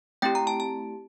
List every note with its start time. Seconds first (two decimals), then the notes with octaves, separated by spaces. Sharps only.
0.22 A3 C4 E4 G4 G5
0.35 A#5
0.47 A5
0.60 A5